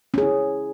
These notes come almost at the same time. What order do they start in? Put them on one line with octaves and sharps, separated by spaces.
C#4 G#4 E4